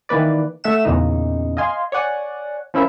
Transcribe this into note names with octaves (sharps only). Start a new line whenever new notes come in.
D#3 E3 A#3 B4 D5
A3 E5 F#5 E7
E2 A#2 C#3 D#4
D#5 F5 G#5 C6
C#5 D5 F#5 G#5
F3 C#4 E4 A#4 E5